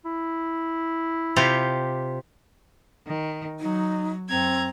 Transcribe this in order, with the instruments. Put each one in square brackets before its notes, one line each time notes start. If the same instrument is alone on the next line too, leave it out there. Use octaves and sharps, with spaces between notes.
[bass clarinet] E4
[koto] C3 F4 G4
[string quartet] D#3
[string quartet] F#3 [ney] D#4
[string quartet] F#2 A#5 G#6 [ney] C4